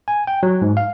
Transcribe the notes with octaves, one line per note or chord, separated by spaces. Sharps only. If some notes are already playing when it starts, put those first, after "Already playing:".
G#5
G5
F#3
G#2
F5